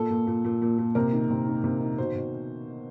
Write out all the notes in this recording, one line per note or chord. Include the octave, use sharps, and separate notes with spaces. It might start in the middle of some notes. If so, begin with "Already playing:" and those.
Already playing: A#2 A4
A#2
A#2
A#2
A#2
A#2
C3 A#4
D#3
C3
D#3
C3
D#3
B2 C5
B2